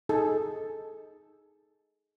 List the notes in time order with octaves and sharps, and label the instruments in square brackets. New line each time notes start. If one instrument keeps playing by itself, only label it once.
[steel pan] D#4 G#4 A4